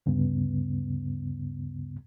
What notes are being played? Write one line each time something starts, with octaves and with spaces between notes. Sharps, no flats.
D2 G2 C#3 B3